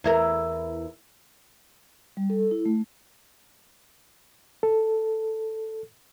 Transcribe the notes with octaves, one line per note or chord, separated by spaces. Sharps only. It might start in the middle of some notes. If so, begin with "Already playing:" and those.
E2 E4 A#4
G3
A4
E4
A3
A4